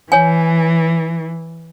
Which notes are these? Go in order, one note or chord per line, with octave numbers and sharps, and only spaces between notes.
E3 C#5 G#5